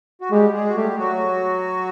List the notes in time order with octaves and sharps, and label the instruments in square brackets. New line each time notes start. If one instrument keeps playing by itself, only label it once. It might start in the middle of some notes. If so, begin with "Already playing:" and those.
[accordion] F#4
[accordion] G3 G4 [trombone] G#3
[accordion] G#3 G#4
F#4
[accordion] G3 G4 [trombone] A3
[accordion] F#3 F#4